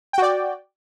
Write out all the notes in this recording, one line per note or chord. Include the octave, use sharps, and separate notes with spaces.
F#4 D5 G5